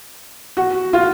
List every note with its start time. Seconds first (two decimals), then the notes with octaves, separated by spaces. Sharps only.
0.57 F#4
0.93 F4